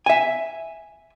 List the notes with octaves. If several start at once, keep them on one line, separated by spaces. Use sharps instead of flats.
E5 G#5